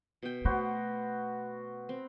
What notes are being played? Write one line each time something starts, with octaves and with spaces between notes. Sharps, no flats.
B2 G5
A3 B3 F#4 C5
C4